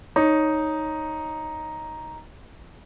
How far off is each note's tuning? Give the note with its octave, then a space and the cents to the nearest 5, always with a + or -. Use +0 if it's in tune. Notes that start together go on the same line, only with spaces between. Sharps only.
D#4 +0 C#5 -5